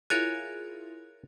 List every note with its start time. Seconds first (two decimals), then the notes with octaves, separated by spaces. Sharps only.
0.10 E4 F4 G#4 A#4 C#5 G#5 F#6 A6